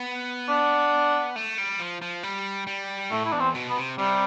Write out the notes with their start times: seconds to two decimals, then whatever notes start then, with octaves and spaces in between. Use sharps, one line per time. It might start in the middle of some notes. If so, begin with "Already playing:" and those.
Already playing: B3
0.49 D4
1.36 A3
1.58 G3
1.80 F3
2.02 F3
2.23 G3
2.67 G3
3.11 A2 A3
3.25 E4
3.32 E2 D4
3.40 C4
3.55 B2
3.69 B3
3.77 C3
3.98 C3 G3